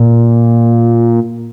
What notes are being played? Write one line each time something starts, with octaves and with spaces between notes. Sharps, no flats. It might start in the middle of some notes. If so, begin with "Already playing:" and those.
Already playing: A#2